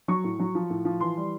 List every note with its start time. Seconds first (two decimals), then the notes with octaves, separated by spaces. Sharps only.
0.08 F#3 C#6
0.24 A2
0.39 F#3
0.55 F3
0.70 A2
0.85 F3
1.00 E3 C6
1.17 G3